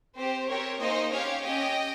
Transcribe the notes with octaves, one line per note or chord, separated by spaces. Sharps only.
C4 G4 C5
C4 G4 A#4 C#5
A#3 D#4 G#4 C5 D#5
C#4 G4 C#5 F5
C#4 G4 D#5 G5